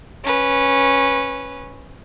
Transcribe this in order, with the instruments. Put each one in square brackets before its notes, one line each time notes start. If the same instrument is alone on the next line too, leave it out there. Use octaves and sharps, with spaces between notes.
[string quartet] C#4 B4